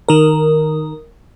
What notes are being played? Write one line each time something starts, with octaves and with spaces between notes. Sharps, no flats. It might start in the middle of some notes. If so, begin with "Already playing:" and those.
D#3 A#4